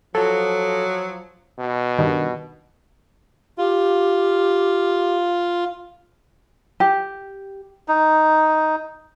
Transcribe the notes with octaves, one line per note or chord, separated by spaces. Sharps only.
F3 F#3 A4
B2
G2 D#3
F4 G4
G4
D#4